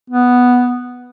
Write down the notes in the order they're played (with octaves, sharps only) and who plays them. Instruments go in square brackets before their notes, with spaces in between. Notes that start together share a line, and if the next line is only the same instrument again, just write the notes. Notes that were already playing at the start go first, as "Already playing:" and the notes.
[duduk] B3